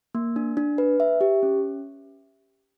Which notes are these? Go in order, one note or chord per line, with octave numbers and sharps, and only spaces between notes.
A#3
D4
D4
B4
E5
G4
C#4